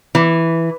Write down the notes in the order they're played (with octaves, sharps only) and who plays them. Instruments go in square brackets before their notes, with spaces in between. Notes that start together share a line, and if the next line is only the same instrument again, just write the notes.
[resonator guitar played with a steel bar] E3